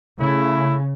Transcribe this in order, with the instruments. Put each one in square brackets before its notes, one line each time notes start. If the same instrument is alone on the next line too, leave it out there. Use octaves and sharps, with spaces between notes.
[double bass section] C#3 [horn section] A3 E4